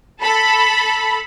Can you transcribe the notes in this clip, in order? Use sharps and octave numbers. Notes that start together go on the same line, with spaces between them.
A4 B5